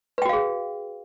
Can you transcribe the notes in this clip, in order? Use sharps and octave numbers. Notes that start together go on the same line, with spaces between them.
F#4 G#4 B4 F5 G5